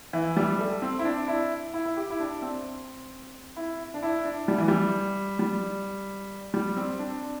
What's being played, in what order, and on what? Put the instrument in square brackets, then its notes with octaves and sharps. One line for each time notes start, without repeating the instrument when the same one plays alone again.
[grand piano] E3
G3
A3
C4
E4
D4
E4
E4
E4
G4
E4
D4
C4
E4
D4
E4
D4
G3
E3
G3
G3
G3
C4
D4